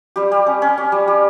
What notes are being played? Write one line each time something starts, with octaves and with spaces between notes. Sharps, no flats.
G3 G4
G3
C#4
C#4
C#4
G3
G3